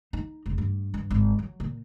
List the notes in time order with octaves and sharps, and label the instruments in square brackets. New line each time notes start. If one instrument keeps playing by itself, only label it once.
[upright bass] D#4
F1
G2
G2
G#1
F#3
A#2